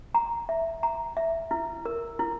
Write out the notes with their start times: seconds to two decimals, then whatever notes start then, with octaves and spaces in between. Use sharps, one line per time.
0.15 A#5
0.49 E5
0.83 A#5
1.17 E5
1.51 E4
1.85 A#4
2.19 E4